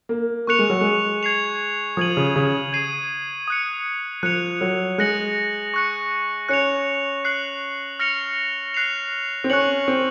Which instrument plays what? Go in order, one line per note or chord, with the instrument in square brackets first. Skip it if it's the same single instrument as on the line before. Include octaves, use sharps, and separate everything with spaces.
[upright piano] A#3
[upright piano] A#3 [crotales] C#6 F#6 C#7 F7
[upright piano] G#3
F#3
G#3
[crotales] G#6 C7 F7
[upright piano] F3 [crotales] D#6 G#6 D#7 F#7
[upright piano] C#3
C#3
[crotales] G#6 C7 D#7
D#6 F#6 C#7
[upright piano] F3 [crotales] F#6 C#7 F7
[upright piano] F#3
[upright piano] G#3 [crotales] F#6 A#6 C#7 F#7
[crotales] C#6 F#6 C#7
[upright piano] C#4 [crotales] F#6 C#7 F7
[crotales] F#6 C7 F#7
F6 A#6 C#7 F7
F#6 C7 F7
[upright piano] C4
[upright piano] C#4 [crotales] C#6 F#6 C#7 F#7
[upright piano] C4